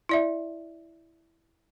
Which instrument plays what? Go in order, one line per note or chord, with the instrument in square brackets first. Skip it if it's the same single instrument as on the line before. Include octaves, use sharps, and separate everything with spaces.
[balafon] E4 D5 E5